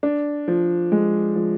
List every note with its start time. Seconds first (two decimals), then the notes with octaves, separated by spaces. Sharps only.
0.03 D4
0.48 F3
0.92 G#3
1.35 F3